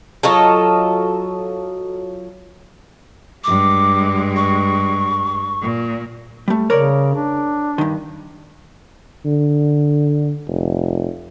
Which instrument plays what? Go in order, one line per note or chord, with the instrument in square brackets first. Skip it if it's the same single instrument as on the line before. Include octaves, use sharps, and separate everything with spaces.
[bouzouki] F#3 F4 A4 D#5
[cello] G2 G#3 [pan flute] D6
[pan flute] C#6
[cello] A#2
[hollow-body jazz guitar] G3 A3
[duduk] C#3 [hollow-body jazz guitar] A#4 C#5 D5
[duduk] D4
[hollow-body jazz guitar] G2 D#3
[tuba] D3
F1